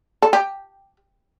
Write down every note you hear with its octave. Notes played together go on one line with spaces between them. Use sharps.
A4
G4